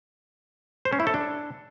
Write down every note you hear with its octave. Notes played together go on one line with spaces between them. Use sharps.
C5
C#4
E4
A4
D4